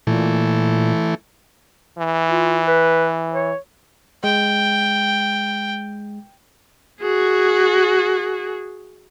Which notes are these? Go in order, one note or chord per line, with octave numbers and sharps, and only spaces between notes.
A#2 E3 A3
E3
F4
B4
C#5
G#3 G5
F#4 G#4